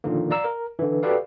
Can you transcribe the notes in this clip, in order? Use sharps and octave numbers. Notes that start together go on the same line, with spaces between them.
A#2 D3 D#3 F3 A#3
D5 F5 A#5 E6
A#4
D3 E3
F#4 G4 A4 B4 D5 F5